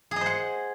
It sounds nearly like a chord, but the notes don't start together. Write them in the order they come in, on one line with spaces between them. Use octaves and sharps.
G#4 D#5 C5 F#5